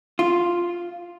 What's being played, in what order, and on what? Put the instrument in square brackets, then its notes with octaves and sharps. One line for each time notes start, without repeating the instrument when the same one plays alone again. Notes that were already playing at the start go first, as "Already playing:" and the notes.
[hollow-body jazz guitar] F4